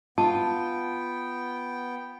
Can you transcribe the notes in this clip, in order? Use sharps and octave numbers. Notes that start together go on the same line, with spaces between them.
B3 F4 G5 A5